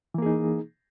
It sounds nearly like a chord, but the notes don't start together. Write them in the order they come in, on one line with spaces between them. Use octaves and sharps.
E3 A#3 G#4 D#4